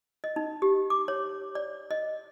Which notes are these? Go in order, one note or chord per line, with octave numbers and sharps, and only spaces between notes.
D#5
D#4
G4
D6
C#5
D5
D#5